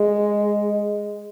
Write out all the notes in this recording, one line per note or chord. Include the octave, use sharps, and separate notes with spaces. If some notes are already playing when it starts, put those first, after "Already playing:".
Already playing: G#3